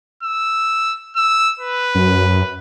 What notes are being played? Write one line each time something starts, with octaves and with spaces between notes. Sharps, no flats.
E6
E6
B4
F#2